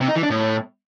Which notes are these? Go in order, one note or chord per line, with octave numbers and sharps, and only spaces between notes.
C3
D#4
E3
D4
A2